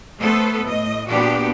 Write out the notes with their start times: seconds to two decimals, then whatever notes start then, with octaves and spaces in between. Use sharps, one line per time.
0.19 A3 B3 A4 B4 C5
0.63 A2 D#5
1.07 A#2 B3 D4 F#4 G4